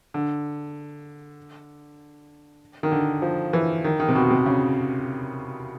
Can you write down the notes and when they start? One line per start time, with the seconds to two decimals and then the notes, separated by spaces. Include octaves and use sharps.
0.14 D3
2.83 D#3
2.92 D3
3.22 F3
3.53 E3
3.84 D#3
4.00 D#3
4.08 C3
4.15 B2
4.30 C3
4.46 C#3